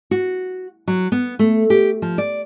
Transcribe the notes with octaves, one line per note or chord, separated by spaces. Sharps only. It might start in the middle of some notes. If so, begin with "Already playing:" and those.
F#4
F#3
B3
A3
G4
F3
D5